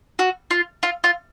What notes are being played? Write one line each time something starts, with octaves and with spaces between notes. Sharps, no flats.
F#4
F4
F4
F4